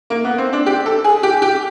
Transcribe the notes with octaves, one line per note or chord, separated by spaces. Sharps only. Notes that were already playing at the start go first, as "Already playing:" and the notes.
A#3
B3
C4
D4
G4
A4
G#4
G4
G4